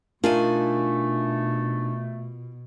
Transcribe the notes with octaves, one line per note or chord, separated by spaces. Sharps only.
B2 A3 D4 D#4 F4 A#4 G#5